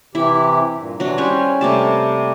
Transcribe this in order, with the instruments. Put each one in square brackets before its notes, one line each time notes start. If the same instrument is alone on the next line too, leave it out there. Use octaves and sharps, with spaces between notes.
[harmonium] C3 E3 G4 [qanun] E4
[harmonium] G2 A#2
[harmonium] C3 E3 [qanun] F#3 D4
[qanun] G3 C#4 G#5 [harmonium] C5
[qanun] C3 A#3 A5 [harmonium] G3 A3 G4